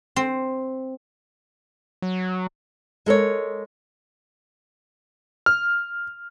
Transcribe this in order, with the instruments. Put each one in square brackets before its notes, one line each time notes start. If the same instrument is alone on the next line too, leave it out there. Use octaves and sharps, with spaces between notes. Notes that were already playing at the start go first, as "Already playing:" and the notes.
[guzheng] C4
[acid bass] F#3
[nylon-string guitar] G#3 A4 A#4 C#5
[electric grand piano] F6